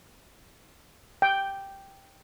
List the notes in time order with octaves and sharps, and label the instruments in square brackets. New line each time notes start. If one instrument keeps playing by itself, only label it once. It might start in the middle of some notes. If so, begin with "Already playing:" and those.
[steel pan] G5